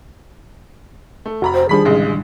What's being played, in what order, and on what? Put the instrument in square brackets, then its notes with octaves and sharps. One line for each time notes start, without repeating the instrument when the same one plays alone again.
[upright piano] A3
[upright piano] F1 A#5 B5 [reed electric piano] F#4
[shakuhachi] C5
[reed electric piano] D#3 G3 D4 [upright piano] F3 B5 B6 [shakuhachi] G#4
[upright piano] A1 C#3 G#3